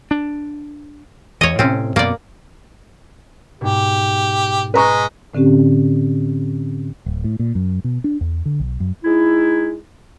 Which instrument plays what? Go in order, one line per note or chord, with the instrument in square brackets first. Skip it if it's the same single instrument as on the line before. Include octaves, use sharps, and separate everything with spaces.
[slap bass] D4
[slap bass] E2 E3 [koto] C#5 D#5
[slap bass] A2 C3 [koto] C4 C#4
[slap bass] F#2 B2 B3 [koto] A#3 D5
[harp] G#2 B2 [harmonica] G4
[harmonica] G#3 [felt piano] B4 A#5 C#6 [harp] B6 E7
[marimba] A2 D3 C4 C#4 G4
[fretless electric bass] D1
A2
A#2
F#2
B2
D4
E2
D3
B1
F#2
[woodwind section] G#3 D#4 E4